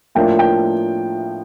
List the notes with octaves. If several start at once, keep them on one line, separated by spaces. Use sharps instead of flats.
A2 F3 A#3 D4 G5
G5